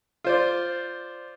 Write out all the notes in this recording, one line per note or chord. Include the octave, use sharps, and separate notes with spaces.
F4 C5 D5